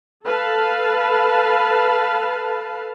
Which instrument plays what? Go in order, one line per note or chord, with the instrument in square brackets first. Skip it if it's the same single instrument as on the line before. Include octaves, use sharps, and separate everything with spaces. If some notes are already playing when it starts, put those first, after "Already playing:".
[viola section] A4 B4 F5 A5